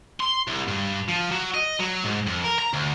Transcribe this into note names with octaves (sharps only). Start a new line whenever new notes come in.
C6
C2
G2
F3
F#3
D#5
F#3
G#2
F2
A#4
A#5
D2